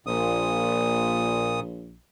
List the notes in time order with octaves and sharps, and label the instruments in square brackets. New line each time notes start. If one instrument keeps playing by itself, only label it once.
[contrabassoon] A#1 [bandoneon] A#2 D#6